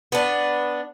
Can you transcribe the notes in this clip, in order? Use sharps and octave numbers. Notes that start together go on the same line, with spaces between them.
B3 D4